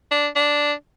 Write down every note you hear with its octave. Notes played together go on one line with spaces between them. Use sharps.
D4
D4